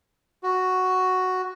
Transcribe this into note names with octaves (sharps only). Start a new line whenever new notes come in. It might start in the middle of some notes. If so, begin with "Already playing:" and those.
F#4